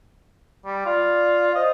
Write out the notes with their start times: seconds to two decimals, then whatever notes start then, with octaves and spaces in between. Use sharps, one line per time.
0.65 G3
0.86 F4 D5
1.55 C5 D#5